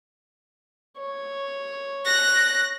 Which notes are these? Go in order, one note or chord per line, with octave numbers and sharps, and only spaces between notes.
C#5
F#6 A#6